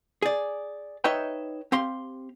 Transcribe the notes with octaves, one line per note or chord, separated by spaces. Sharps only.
G#4 D5
D#4 B4 C#5 D#5 E5 G5
C4 G4 F5 C6